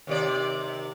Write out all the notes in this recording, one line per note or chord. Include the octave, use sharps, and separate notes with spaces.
D#2 C3 D5